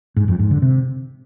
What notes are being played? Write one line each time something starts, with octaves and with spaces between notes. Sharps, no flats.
G#2
F2
G#2
D3
C3